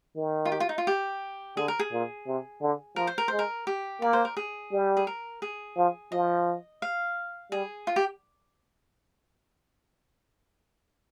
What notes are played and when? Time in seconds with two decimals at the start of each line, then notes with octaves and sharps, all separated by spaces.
0.16 D#3
0.45 F4
0.52 G4
0.60 F4
0.69 D#4
0.78 F4
0.87 G4
1.57 D3 G#4
1.68 A#4
1.79 G#4
1.92 A#2
2.27 C3
2.62 D3
2.96 F3 A#4
3.07 C5
3.18 A#4
3.28 G#3 C5
3.39 A#4
3.67 G4
4.01 A#3 D5
4.13 C5
4.25 A#4
4.37 G#4
4.72 G3
4.97 G#4
5.07 A#4
5.42 G#4
5.77 F3
6.12 F3 D#5
6.82 F5
7.52 G3 G#4
7.87 F4
7.96 G4